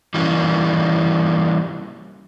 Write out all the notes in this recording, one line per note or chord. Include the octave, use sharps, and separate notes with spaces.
E3 G3 A#3 C#4